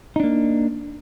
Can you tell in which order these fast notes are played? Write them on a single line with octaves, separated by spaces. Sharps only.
D#4 D4 A#3